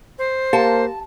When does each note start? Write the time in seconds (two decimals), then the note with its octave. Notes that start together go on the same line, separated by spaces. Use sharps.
0.19 C5
0.53 A#3 G4 F5 A5